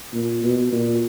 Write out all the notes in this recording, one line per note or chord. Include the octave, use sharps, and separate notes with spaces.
A#2
B2
A#2